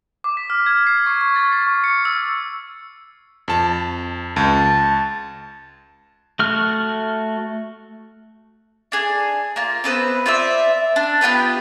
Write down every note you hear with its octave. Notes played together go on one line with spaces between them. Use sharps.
D6
B6
F6
G#6
C7
C#6
C#6
A6
C7
C#6
C#7
E6
F2 A5
C#2 A5
A3 F#4 F6
D4 G#4
A#3 F4
B3 C4 B4 C5
F4 C5 D5 E5
D4
B3 F4 G4 B4